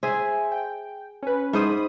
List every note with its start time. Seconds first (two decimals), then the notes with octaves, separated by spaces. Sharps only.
0.03 G#4 C5 E5 G#5
0.52 G5
1.23 C#4 B4
1.53 G#2 C5 B5 D#6